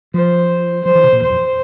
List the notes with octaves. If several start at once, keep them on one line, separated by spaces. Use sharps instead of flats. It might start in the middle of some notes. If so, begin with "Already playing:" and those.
F3 C5
F3 C5
E3
C3
A#2
E2 C5
F2